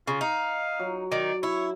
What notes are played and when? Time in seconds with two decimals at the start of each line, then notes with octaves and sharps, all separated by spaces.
0.07 C#3 F4
0.21 D#4 F5
0.80 F#3
1.12 D#3 D5
1.43 E4 C#5